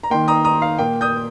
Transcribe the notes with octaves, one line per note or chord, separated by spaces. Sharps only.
A#5
D#3 A#3 G5 C6
A#5 D#6
A#5 D#6
F5
A#2 A#3 G5
D#6 G6